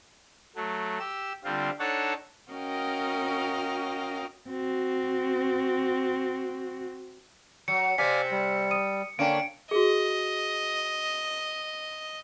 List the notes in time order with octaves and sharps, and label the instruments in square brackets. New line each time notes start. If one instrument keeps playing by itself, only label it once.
[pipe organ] F#3 A3
G4 E6
D3 G3 C4 F4
D4 D#4 A4 C#5 F#5 A5
[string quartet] C#4 F#4 A#4 D#5 F5 G5
[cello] C4 F#4
[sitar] F#3 [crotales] C#7
[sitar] C3 C4 [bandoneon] D5 F5 G#5 [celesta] B6
[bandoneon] G3
[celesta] D#6 D#7
[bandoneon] D3 A#3 [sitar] C#4 D4 [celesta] F5 G5 [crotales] D7
[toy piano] F#4 G#4 [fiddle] D#5